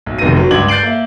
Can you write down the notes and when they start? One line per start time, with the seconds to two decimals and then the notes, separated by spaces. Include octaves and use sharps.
0.06 B1
0.18 F1 C3 D#3 B3 A#6 D#7
0.36 F#3
0.51 C#2 G2 D6 G#6 F#7
0.68 G6 A6 C7 D7 F#7
0.83 A#3 E5